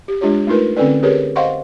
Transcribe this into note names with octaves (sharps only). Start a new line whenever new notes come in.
G4
G#3 D4 F4 G4 C#5
A3 D#4 F4 A#4 B4
D3 C4 C#4 A4 B4 D5
G4 G#4 A#4 B4 C#5
C5 D#5 F5 F#5 C6 C#6